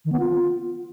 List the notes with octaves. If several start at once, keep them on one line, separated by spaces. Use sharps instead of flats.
D#3
B3
F4